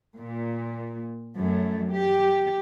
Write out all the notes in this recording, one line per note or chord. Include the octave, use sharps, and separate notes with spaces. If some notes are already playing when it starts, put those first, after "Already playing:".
A#2
F#2 A3
G4